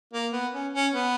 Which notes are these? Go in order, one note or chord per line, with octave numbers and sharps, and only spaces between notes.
A#3
B3
C#4
C#4
B3